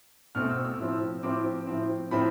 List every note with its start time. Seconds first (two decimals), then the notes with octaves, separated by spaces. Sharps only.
0.35 B2 A3 C4 F6
0.50 E6
0.65 E6
0.79 A2 F3 C4
1.23 A2 F3 C4 D6
1.67 A2 F3 C4
2.11 A2 F3 C4 B5